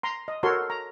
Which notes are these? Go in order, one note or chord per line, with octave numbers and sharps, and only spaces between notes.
A#5 C6
D#5
F#4 A4 A#4 C#5 C6
A#5